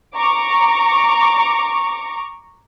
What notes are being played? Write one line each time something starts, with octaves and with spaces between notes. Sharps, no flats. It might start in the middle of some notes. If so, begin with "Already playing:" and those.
A#5 C#6 D6